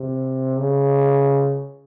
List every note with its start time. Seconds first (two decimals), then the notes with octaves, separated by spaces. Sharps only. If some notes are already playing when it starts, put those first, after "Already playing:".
Already playing: C3
0.59 C#3